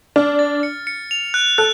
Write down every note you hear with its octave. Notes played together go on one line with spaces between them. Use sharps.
D4 F6
A6
C#7
C#7
F7
F#6
A4 F#6